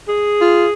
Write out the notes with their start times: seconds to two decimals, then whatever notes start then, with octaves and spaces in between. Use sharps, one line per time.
0.08 G#4
0.39 F4